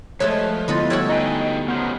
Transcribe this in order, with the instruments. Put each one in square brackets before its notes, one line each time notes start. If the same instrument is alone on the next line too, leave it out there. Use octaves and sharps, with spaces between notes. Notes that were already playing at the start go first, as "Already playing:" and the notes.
[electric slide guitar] F3 [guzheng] G#3 A3 B4 [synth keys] C#5
[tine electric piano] D3 B3 A6 [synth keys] E4 F4 [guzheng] B4 D#5 F#5
[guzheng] G3 A3 F#4 [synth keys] C#5 E6
[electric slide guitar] D#4 B4 G5 [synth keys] D#5 G#5
[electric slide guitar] C#3 F3 F#3 [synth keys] B3 [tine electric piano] F6 G6